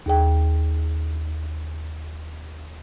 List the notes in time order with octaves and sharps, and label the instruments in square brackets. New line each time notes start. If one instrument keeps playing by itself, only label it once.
[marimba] D#2 G#4 G5